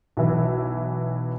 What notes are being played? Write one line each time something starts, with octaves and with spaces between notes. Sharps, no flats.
B1 E3